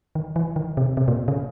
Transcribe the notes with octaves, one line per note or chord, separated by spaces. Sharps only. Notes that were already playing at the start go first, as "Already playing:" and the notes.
D#3
E3
D#3
C3
C3
A#2
C#3